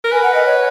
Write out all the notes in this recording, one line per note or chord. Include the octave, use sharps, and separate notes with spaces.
A#4
B4 G#5
F#5
D#5
C#5